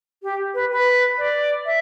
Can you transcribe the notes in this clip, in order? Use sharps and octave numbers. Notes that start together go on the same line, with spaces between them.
G4
B4
B4
D5
E5